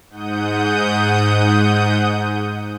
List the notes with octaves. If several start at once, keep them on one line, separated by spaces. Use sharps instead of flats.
G#2 F#5 D#6 G6